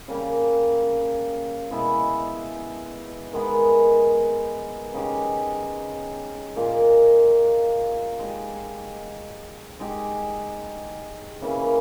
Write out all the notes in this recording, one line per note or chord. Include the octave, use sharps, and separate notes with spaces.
C#3 G3 A#3
B2 G#3 B3 E4
D#3 G#3 B3
C#3 G#3 D#4 G4
A#2 A#3 D#4 G#4
G#3 D#4 G4
G#3 D#4 G4
C#3 E3 A#3